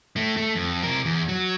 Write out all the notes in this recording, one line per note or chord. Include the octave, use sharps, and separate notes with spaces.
A2 A3
A3
F2
C3 A#4
E2
F#3